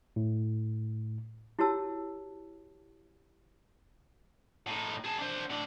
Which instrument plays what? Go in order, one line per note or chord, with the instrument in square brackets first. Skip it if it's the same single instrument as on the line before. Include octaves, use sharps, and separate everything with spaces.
[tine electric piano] A2
[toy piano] E4 F#4 G4 C#5 A5 E6
[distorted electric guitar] A2 D#4
G#4 A5
D4 C5
A2 D4